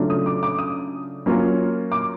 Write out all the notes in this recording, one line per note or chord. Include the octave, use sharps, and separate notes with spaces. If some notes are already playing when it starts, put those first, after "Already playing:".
Already playing: C#3 F#3 A3 D4 F4
D#6
D6
D6
D#6
F#3 A#3 C#4 F4
D6